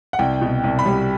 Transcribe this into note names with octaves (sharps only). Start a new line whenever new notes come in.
F#5
C2 G5
B2
C2
B5
G3